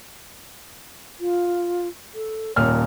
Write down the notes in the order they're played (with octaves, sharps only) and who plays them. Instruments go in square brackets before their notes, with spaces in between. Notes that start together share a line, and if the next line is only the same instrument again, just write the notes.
[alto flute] F4
A4
[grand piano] D#1 A#2 F6 [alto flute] C#5